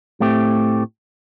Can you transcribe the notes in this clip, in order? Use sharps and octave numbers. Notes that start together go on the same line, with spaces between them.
A2 A3 C4 G4